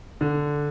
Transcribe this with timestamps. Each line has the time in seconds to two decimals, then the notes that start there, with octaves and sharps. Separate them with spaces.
0.21 D3